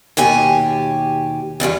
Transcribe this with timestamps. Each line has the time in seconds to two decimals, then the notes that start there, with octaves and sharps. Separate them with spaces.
0.17 D#2 B2 G4 G#5
1.60 E2 D#3 G3 F4